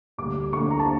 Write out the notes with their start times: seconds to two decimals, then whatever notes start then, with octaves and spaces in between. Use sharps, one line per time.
0.18 D2 D3 G3 A#3 D6
0.53 D2 D3 G3 A#3 C#6
0.71 A#5
0.79 A5